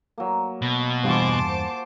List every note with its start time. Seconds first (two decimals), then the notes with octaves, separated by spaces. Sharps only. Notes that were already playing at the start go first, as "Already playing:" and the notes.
0.18 F#3 A#3
0.62 B2
1.04 E2 G2 F4 F#4 C5 G#5 A5 D6